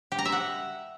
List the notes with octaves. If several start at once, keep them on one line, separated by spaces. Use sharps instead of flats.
G4
A#5
E5
F#5